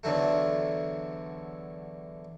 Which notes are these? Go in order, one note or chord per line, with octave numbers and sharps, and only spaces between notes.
E2 D3 F#3 A3